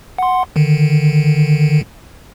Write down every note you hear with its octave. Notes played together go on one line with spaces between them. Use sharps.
F#5 C6
D3 D#3